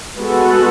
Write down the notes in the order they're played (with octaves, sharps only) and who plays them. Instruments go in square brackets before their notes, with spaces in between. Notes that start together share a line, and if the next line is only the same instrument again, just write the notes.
[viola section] G#3 B3 F#4 A4